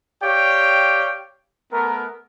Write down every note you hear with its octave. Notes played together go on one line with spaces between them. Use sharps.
G4 C#5 D5 F5 G5
A3 B3 A#4